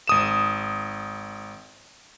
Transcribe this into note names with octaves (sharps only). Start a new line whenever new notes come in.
G#1 D#6 E7